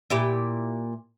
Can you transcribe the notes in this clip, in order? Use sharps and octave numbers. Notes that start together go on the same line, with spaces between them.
A#2 E4 G4